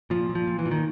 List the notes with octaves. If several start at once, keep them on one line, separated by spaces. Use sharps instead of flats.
A#2 F3
A#2
F3
A#2
E3
A#2
D#3